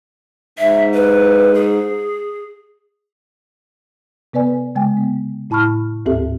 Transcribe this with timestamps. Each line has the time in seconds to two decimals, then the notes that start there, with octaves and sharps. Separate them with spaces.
0.59 G#2 E5
0.94 B4
1.55 G#4
4.33 C3 B3 B4 D5 G#5
4.75 C#3 G#3 G5 G#5
4.97 B3
5.50 A2 E4 A5 B5 C#6 F6
6.06 D2 G#2 C4 G4 A4 E5